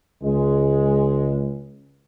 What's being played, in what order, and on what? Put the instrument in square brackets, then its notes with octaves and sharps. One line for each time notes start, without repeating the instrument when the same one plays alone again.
[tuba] C#2 [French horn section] G#3